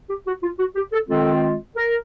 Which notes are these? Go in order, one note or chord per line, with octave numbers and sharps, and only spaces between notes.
G4
F#4
F4
F#4
G4
A4
D#3 G#3 C4 F4 A4
A#4